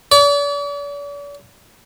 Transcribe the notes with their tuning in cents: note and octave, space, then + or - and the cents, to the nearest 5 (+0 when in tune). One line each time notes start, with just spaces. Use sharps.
D5 -45